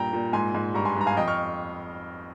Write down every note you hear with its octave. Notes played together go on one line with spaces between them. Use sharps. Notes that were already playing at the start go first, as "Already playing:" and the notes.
Already playing: G2 A#2 G5 A#5
A#2
G#2 G#5 C6
G#2
G2 A#5 C#6
G#5 C6
G2 A#5
F5 G#5
F2 D#5 G5
C#6 F6